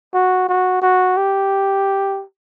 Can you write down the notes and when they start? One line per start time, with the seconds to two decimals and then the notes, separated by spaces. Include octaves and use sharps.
0.14 F#4
0.49 F#4
0.82 F#4
1.17 G4